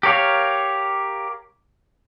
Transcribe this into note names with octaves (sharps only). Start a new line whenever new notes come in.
G4 A#4 C#5 F5